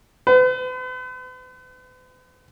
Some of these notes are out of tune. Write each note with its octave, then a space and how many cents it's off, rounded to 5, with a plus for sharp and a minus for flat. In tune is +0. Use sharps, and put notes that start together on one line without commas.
B4 +45